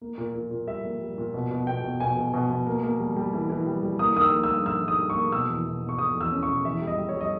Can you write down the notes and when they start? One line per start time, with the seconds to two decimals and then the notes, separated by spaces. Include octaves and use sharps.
0.01 A#3
0.18 A#2
0.35 A#2
0.51 A#2
0.67 G3 E5
0.85 A#3
1.01 G3
1.18 A#2
1.34 B2
1.51 B2
1.67 B2 G5
1.84 B2
2.00 B2 G#5
2.17 B2
2.33 B2
2.50 B2
2.67 A#3
2.83 A#3
3.00 G3
3.16 G3
3.33 E3
3.50 E3
3.67 G3
3.83 G3
3.99 A#3 D#6
4.16 D#3 D#6
4.21 E6
4.33 A#3
4.44 E6
4.49 G2
4.66 D#3 E6
4.82 D#3
4.88 D#6
4.99 G3
5.10 C#6
5.16 A#3
5.32 B2 E6
5.49 E2
5.66 B2
5.82 B2
5.89 C#6
5.99 B2 D#6
6.15 E2
6.21 E6
6.32 C#4
6.43 C#6
6.48 B2
6.65 E2 E5
6.82 G3
6.87 D#5
6.98 G3
7.09 C#5
7.14 G3
7.21 D#5